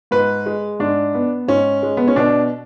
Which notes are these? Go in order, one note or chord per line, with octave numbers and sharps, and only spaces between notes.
G#2 B4
G#3
G#2 D4
B3
G#2 C#4
G#3
B3
C#4
B2 D4